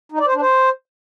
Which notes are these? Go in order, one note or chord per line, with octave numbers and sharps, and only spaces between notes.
D#4
D5
C5
D4
C5